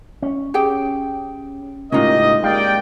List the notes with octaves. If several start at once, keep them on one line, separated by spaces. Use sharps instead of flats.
C#4
G4 G#4 G5
C#2 A2 A#3 C#4 D#4 F4 G4 D#5
G#3 A#3 G4 D5 F5 G5